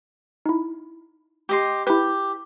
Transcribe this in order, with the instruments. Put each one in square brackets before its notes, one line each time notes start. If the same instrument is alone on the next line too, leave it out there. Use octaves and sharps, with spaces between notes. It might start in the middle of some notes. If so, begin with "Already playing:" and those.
[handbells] D#4 E4
[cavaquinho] G4 D#5 C6
[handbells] E4 B4 [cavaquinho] G4